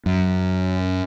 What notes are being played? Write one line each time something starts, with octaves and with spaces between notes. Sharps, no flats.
F#2